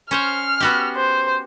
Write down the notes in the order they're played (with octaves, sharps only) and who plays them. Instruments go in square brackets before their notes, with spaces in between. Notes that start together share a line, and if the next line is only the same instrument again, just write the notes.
[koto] C#4 C5 C#5 [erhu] F6
[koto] B3 F#4 G4
[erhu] C5